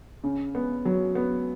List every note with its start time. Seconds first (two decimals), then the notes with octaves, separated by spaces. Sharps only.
0.24 C#3
0.55 B3
0.85 F#3
1.15 B3